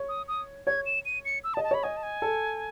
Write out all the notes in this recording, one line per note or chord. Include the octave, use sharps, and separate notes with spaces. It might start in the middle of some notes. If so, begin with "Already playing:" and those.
Already playing: C#5
D#6
D#6
C#5 G#6
E7
D#7
C#7
E6
A5
D#5
A5
C#5 B5
D#5 G#5
A5
G#5
A4